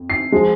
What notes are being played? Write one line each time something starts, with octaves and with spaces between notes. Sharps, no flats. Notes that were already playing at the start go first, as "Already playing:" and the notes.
Already playing: F2
C7
F3 G#3